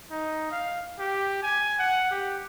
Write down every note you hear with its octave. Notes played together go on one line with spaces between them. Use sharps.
D#4
F5
G4
G#5
F#5
G4